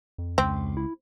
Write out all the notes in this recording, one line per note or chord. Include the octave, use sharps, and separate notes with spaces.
F2
C#2 C4
E4